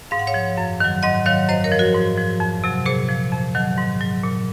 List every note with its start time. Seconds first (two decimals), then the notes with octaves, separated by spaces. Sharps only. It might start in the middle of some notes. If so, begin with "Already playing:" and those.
0.11 G#2 F5
0.19 F#5
0.27 C#5 F5
0.34 F3
0.57 F#2
0.80 D#3 F#3
1.02 G#2 D#5 F#5
1.26 D#3 F#3 C#5 F5
1.49 F#2 C5 D#5
1.64 A#4 C#5
1.72 F3
1.79 F#4 A#4
1.94 G#2
2.17 F3
2.40 F2
2.64 C3 F#3
2.86 A#2 G#4 C5
3.09 F3
3.32 F2
3.55 D#3 F#3
3.78 G#2
4.01 F#3
4.23 A#2